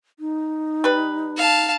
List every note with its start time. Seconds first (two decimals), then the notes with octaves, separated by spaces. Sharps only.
0.19 D#4
0.84 G3 B4
1.37 F5 A5